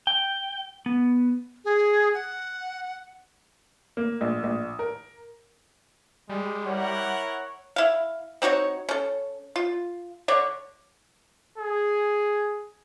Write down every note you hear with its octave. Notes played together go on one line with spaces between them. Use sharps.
G5
B3
G#4
F#5
A#3
A#1
A#1
A#4
G3 G#3
E4 A#4 C#5 F#5
E4 F5
C4 D#4 F#4 C#5
C#4 A4
F4
D3 D4 C#5
G#4